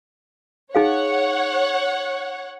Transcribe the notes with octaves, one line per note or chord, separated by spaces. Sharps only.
D#4 G#4 C#5 F5 F#5